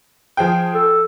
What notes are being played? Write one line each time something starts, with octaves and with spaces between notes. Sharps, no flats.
F3 G#4 G5
A4